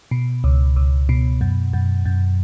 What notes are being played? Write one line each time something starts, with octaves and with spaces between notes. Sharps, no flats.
B2
C#2
C#2
B2
F#2
F#2
F#2